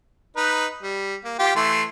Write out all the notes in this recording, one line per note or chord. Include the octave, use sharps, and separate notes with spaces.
D#4 B4
G3
A#3
F4 G4
E3 A3 C6